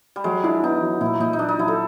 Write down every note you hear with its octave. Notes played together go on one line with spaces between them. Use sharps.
G3
F#3 G#3
D4 E4
B3 D#4
F#3
A#2 E4
A#2 D#4
D#4
F#3 D4
D#4
F#3 E4
A4